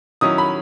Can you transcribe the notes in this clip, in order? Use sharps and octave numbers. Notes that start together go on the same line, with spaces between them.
D#3 F#3 C#4 E4 D#6
B5